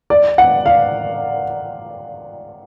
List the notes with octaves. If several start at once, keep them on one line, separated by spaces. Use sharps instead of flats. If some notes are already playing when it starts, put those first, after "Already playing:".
D5
F#5
F5